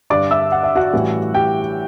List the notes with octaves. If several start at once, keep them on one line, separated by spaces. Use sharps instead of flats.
G2 D3 G3 D4 D5 D6
E5 E6
F#5
E5
F#4 F#5
A1 A2 E3 G3
G4 G5